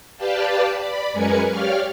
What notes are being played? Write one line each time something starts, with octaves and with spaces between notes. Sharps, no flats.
G4 B4 D5 F5 G5 A5
D5 B5
F#2 G#3 A#4 B4 G#5 C#7
G4 C#5 D5 F5 F6